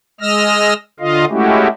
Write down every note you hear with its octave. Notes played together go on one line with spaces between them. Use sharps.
G#3 D#5 E6 F6 A#6
D3 F4 D#5 F5
G#3 A3 C#4 E4 F#4 G4